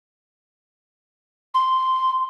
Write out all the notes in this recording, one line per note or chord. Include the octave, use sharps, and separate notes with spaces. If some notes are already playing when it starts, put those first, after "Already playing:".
C6